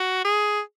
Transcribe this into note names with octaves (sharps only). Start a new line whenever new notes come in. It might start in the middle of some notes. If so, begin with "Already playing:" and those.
Already playing: F#4
G#4